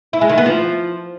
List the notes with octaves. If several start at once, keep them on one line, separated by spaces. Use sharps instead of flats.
E4
G#3
D#3
B3
F3